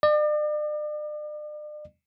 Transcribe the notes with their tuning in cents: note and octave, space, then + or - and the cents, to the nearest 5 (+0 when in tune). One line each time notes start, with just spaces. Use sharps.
D5 +40